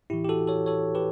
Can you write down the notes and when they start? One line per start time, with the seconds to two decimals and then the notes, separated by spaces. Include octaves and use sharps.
0.10 A2 E3 E4 G4
0.25 G4
0.29 F#4 A4
0.47 A4 C#5
0.66 A4 C#5
0.95 G4 B4